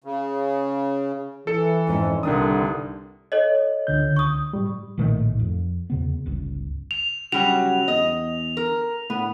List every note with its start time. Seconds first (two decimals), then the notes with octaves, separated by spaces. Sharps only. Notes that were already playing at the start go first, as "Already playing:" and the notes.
0.04 C#3
1.47 E3 A4 C#7
1.87 F2 G#2 C#4
2.23 C2 G2 D3 D#3 D4 D#6
3.32 A4 C#5 D#5
3.87 C#2 D3 G6
4.16 C#6 D#6
4.53 G#2 G3
4.98 A#1 A2 D#3 A3
5.39 F2
5.90 E2 C#3 B3
6.26 G1 C#2
6.91 F7
7.32 C#3 F#3 G3 F#4 F7
7.88 E2 D#5
8.57 A#4
9.10 A2 B3